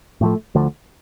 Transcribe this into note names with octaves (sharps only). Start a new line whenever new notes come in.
A2 F3 A3
D2 D3 F3 A3